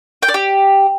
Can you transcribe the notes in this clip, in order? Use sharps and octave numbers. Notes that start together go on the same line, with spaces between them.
G5
D5
G4